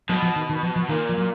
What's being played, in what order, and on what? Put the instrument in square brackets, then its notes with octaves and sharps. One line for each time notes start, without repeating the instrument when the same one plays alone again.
[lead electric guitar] B2 [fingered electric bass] F#3
[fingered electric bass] F3
D#3
D#3
F3
F3
[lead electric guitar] A#2 [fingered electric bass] D#3
[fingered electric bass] F3
F#3